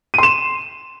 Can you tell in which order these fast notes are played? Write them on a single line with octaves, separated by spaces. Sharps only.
D#7 C6 E7